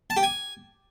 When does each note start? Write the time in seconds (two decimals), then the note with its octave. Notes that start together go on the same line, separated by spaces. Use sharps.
0.10 A5
0.17 G4
0.23 G#5